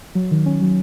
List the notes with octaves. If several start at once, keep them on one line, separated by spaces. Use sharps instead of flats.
F#3
D#3
C#4
F#3